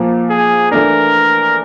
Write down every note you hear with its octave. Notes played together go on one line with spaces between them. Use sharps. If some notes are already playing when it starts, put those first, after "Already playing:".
Already playing: A#2 F3 A#3
G#4
E3 A3 D4 A#4